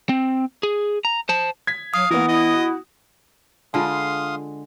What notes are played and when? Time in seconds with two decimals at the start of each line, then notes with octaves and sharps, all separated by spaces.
0.09 C4
0.63 G#4
1.05 A#5
1.29 C5 A5
1.67 G#6 B6
1.94 F#3 F5 D#6
2.11 E3 A#3 B3 A#4
2.28 E4 D#5
2.54 F#4
3.74 D3 G#3 F4 F5 A5 C6 D#6